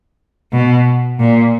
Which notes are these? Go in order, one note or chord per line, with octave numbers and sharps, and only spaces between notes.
B2
A#2